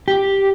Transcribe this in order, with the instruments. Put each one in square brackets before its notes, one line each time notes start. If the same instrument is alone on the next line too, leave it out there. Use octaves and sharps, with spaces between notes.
[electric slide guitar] G4